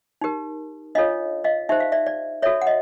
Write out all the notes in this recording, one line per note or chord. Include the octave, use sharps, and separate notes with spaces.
D#4 G4 A#4
D4 F4 A4 C#5 D#5 F5
D#5 F5
D#4 G4 C5 E5
F5
D5 E5
D5
F#4 A4 C#5 D5 E5
F#5
D#5